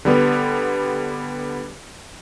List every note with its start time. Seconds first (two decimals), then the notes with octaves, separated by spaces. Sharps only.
0.05 D3 G3 B3